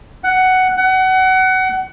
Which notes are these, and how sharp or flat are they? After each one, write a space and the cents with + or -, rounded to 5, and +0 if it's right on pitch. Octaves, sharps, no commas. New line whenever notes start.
F#5 +10
F#5 +25